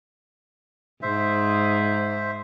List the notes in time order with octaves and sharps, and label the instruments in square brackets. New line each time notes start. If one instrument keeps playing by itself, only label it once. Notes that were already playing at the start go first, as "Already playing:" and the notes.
[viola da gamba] G#2 [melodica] C5 E5